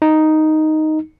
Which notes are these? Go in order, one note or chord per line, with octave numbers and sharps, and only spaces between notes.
D#4